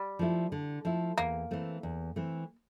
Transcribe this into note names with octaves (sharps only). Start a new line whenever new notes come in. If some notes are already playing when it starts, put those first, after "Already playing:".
Already playing: G3
F3 A3 E4
D3
F3 A3 E4
E2 A#3
E3 A3 C4
E2
E3 A3 C4